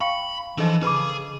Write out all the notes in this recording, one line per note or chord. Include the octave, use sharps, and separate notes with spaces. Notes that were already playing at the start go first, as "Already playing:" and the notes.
F5 G5 B5 C#6
E3 F3 D4 A4 D#5
C#3 G#4 B4 B5 D6